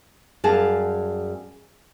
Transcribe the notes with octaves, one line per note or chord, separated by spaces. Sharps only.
F#2 G3 G#4 F5 A5